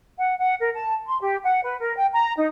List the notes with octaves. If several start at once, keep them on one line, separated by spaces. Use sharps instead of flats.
F#5
F#5
A#4
A5
C6
G4
F#5
B4
A#4
G5
A#5
D#4